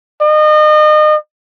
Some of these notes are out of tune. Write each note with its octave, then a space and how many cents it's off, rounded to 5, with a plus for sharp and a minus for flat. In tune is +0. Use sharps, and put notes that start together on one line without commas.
D#5 -35